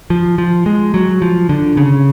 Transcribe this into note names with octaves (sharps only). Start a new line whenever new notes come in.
F3
F3
G#3
F#3
F3
D3
C#3